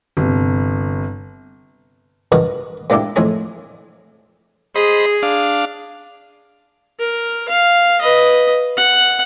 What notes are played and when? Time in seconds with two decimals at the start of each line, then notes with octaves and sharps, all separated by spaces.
0.17 G1 C3
2.32 G2 F#4 A#4 B4 D#5
2.90 G#2 A#3 D4 E4 G4
3.16 F2 A2 D#4 G#4 A#5
4.75 G#4 C5 D#5 B5
5.23 D4 F5
6.99 A#4
7.49 F5
8.01 B4 D#5
8.77 F#5